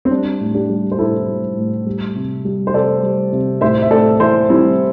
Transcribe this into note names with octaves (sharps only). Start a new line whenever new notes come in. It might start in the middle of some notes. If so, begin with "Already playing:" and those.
C4
G3 D4
A2
D4 G4
G3
C5
A2 E4 A4
G3
A2
G3
C3
G3
C5
C3 A4 D5
G3
C3
A2 C5 E5
E5
A2 A4 D5
E3 C5 E5
G3 C4 E4